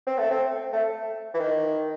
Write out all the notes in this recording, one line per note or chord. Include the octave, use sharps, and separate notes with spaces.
C4
A3
C4
A3
E3
D#3